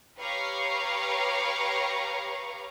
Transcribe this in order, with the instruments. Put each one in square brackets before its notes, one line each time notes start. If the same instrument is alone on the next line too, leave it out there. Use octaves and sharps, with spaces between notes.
[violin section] G4 B4 C#5 F5 A#5 C#6